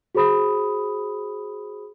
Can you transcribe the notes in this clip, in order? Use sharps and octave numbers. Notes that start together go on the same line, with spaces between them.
F#4 G#4 C5 B5 D#6